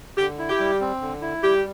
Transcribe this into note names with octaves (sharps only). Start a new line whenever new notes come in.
D3 G4
E4
G4
G3
C4
D3
E4
G3 G4